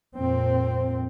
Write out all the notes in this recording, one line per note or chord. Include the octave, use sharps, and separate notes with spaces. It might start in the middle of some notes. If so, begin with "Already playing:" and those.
F2 A#2 C4